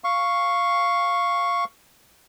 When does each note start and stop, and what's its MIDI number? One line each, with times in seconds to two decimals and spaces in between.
0.04 1.64 77
0.04 1.64 85